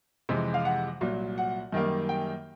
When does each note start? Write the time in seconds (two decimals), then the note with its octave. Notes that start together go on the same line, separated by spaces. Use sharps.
0.29 F2 C3 E3 G#3
0.54 F5
0.65 F#5
1.01 C2 A#2 F#3
1.38 F#5
1.72 F#2 D#3 G3 A#3
2.09 G5